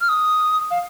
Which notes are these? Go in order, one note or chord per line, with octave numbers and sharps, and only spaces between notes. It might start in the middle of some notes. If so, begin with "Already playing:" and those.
F6
D#6
F5